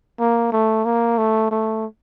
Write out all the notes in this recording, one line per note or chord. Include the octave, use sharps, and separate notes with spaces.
A#3
A3
A#3
A3
A3